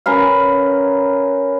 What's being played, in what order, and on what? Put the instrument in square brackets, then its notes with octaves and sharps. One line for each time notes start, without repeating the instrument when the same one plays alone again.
[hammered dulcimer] C#4 A#4 B4 F5